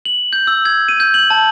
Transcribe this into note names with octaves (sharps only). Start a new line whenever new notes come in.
F#7
G6
E6
G#6
D#7
G6
F#7
A5